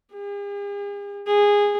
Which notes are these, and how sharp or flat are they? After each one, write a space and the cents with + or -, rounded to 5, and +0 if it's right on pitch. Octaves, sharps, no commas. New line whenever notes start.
G#4 -45
G#4 -15